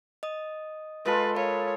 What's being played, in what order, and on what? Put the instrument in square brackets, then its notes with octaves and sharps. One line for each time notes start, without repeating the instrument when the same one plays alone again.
[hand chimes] D#5 D#6
[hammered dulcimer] G#3 F4 A4 [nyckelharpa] B4
[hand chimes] A#4 F5 B5 [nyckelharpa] C#5